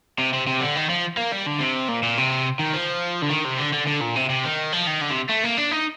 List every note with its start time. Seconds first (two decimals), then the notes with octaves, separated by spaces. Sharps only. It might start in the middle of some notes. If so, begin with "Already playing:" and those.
0.19 C3
0.33 C3
0.47 C3
0.61 D3
0.76 D#3
0.90 F3
1.17 A#3
1.32 G3
1.46 D3
1.60 C3
1.88 A#2
2.03 A#2
2.17 C3
2.59 D#3
2.74 F3
3.22 D3
3.30 D#3
3.45 C3
3.59 D3
3.73 D3
3.87 D3
4.01 A#2
4.16 C3
4.29 C3
4.44 D#3
4.72 F3
4.87 D#3
5.01 D3
5.10 C3
5.29 A3
5.43 A#3
5.57 D4
5.71 D#4